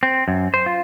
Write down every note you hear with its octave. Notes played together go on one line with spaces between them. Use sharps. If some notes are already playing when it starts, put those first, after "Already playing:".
C4
F#2
C5
F4